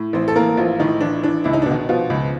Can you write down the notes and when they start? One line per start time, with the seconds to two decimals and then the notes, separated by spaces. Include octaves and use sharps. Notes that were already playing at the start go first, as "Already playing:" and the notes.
Already playing: A2
0.13 A1 C4 C5
0.28 A4
0.35 E3 A#3 A#4
0.57 A1 F3 F4
0.80 A2 D#3 D#4
1.01 A1 D4
1.23 E3 D4
1.44 C#2 E4
1.53 D#4
1.62 D4
1.66 B2
1.71 D#3 D#4
1.89 B2 F3 F4
2.10 C#2